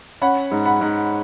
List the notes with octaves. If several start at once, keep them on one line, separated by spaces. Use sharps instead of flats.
C#4 F#5 B5
G#2
F#5 B5
G#2